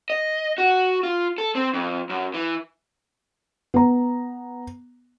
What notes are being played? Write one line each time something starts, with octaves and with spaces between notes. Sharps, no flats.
D#5
F#4
F4
A4
C4
F2
F#2
E3
B3 A#5